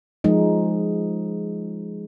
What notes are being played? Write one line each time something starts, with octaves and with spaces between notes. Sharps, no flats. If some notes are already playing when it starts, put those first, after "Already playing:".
F3 G#3 D#4